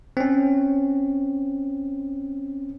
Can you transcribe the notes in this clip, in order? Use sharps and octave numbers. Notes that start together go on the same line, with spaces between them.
C4 C#4